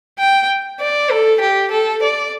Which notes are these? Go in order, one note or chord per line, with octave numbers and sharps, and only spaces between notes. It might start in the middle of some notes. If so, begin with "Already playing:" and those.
G5
D5
A4
G4
A4
D5